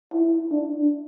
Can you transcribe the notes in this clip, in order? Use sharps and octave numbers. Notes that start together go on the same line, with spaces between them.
E4
D4